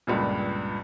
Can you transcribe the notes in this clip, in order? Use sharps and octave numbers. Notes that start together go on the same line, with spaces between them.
C#2 G2 A#2